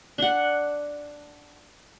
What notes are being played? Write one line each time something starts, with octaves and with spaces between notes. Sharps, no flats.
D4 F#5